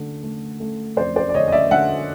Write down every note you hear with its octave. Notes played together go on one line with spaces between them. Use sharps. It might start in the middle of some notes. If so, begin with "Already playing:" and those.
Already playing: D3 A3
A3
A3
F2 C5 D5
C5 D5
D5
D3 C#5 D#5
D#5
D5 E5
D3 E5 F#5